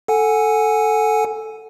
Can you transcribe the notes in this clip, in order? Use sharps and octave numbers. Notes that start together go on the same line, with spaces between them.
A4 F#5 G#5